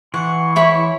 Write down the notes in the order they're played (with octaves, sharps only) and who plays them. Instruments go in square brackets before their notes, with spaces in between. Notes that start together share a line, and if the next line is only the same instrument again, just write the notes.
[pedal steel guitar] E3 [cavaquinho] F#5 [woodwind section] C6 C#6
[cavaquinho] E4 C#5 B5